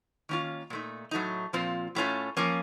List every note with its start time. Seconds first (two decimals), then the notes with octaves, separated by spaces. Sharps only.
0.29 D#3 A#3 C#4 F4
0.70 A#2 A3 D#4
1.11 A2 F#3 A3 D#4
1.53 A#2 F3 C4 F4
1.95 A2 A3 C#4 F4
2.37 F3 A#3 C#4